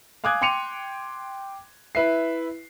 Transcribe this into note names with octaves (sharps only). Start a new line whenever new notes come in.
F5 G#5 D6 D#6 F#6 G#6
G5 C6 D6 C#7 D#7 F7
E4 B4 E5 C7